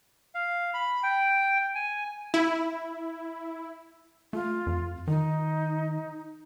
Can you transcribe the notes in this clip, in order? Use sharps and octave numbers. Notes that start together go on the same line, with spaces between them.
F5
B5
G5
G#5
E4
A3 F4
F2
D#3 D#4